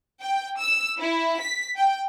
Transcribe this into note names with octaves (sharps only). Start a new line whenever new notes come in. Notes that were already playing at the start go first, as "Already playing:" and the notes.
G5
E6
E4
B6
G5